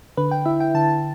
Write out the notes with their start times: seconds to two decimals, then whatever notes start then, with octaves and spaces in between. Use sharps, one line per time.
0.17 D3 B4
0.31 G5
0.46 E4 E5
0.60 G5
0.74 D3 A5